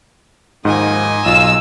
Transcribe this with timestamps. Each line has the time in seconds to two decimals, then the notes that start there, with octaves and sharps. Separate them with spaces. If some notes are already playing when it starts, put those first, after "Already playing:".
0.65 D#2 G#2 D#3 F3 D#5 G#5
1.26 B1 F4 E6